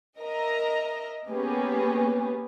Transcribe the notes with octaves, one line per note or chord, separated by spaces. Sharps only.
A#4 D#5 E5 A#5
A#3 B3 C#4 G4 G#4 B4